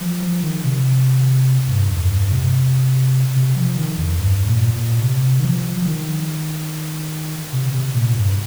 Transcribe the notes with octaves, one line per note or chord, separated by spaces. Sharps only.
F3
F3
D#3
C3
G2
F2
G2
C3
C3
F3
D#3
F2
G2
A#2
A#2
C3
D#3
F3
F3
D#3
C3
C3
A#2
G2